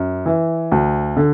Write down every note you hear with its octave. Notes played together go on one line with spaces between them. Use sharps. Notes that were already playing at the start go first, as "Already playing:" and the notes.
Already playing: F#2
E3
D2
D3